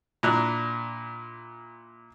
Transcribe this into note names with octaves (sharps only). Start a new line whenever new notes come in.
A#2 D4 E4 A#5 F#6